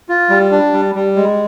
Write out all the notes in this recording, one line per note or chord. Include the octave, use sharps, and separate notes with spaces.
F4
G3
D4
G3
G3
G#3